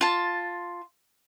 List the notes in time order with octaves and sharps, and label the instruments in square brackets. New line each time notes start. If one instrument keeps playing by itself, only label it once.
[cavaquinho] F4 A5